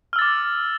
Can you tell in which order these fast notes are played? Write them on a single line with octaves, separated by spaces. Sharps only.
F6 E6 A6 D6